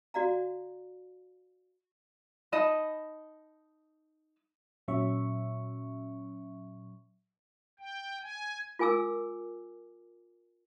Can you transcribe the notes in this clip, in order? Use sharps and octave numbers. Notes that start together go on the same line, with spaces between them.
F#4 D5 F5 A#5
D#4 D#5 A5 B5
A#2 F#3 C#4 E5 C#6
G5
G#5
F4 A#4 G#5 D6 E6